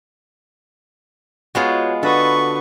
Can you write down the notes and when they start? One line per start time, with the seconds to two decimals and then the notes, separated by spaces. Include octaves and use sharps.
1.55 G#3 B3 F4 F#4 C#5 F#5
2.03 D3 F#4 A4 B4 C#6 D#6